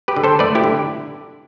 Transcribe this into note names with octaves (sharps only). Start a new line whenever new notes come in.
G4 B4
D3
A4 C5
A3 B4 D5
E4 G4
D3